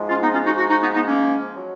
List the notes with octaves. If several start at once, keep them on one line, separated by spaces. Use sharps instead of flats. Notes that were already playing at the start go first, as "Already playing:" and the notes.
Already playing: G#2 F3 G#3
C#4 F4
B3 D#4
C#4 F4
D#4 F#4
D#4 F#4
D#4 F#4
B3 D#4
B3 D#4
A#3 C#4
F#3